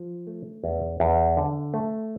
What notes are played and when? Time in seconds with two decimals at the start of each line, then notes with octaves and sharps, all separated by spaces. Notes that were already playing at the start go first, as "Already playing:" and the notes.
Already playing: F3
0.27 A3
0.64 E2
1.00 E2
1.37 D3
1.74 A3